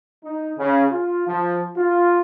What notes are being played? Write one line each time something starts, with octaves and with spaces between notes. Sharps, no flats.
D#4
C#3
F4
F3
F4